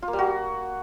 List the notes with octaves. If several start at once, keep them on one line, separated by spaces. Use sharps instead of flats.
F4
A#3
G3
F#4